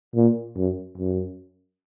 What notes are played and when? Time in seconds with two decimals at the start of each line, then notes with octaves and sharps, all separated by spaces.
0.15 A#2
0.56 F#2
0.98 F#2